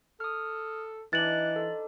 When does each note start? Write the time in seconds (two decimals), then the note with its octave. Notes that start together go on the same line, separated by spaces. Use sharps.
0.20 A4 D#6 F6
1.13 E3 D4 D#4 F#6 A6 F#7
1.56 A4 C5 F5